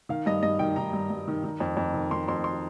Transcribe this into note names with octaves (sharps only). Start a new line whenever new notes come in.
D#3 F5
G2 D#5
G2 D#5
D#3 G5
D#3 A#5
G2
G2
D#3
D#3
F2
F2
D#3
D#3 C6
F2 C6
C6